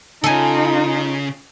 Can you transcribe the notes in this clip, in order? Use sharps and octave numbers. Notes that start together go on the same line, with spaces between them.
C#3 D#4 F4 A4 G#5